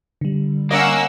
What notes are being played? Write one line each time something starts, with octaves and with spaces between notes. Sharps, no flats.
D3 G3
A#3 C#4 A#4 D#5 F#5 E6